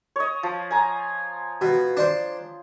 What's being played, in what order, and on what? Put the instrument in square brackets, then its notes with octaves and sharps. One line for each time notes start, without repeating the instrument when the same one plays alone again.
[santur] C#5 D#5
F3
G#5 A#5
[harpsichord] B2
D4 C5